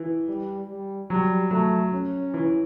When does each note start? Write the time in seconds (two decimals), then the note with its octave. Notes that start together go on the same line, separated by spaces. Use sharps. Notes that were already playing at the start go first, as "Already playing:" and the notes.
Already playing: E3
0.28 G3
0.69 G3
1.10 F#3 G3
1.51 F#3 A3
1.92 C#4
2.34 E3